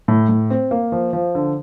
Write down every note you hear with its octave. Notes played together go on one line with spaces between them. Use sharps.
A2
A2
C4
A#3
F3
F3
D3